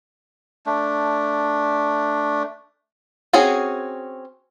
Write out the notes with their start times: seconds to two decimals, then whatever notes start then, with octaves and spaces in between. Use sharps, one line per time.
0.66 A3 D4
3.33 C4 C#4 F#4 G#4